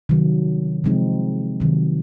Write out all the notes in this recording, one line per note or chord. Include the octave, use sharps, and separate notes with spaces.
C3 D#3 F#3
C3 F3 G#3 C4 D#4
C3 D#3 F#3